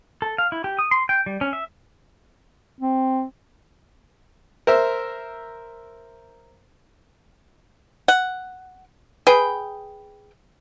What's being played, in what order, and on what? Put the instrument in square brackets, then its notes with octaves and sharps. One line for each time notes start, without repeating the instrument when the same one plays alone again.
[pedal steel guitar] A4
F5
E4
G4
D#6
C6
G5
G3
C#4
E5
[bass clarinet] C4
[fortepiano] A#4 C5 E5
[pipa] F#5
G#4 B4 G5